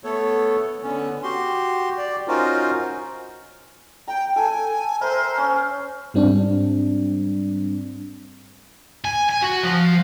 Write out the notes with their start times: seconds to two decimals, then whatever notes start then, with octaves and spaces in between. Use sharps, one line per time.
0.04 A3 B3 A4 C#5
0.83 D3 B3 C#4
1.23 F#4 G4 C6
1.98 G4 D5
2.28 C#4 D#4 F4 F#4 A#4 C5
4.08 G5 A#5
4.36 A4 G5 G#5
5.01 A#4 C5 E5
5.38 C#4
6.14 G#2 G3 C4 D4
9.05 G#5
9.29 G#5
9.42 F#4
9.63 F3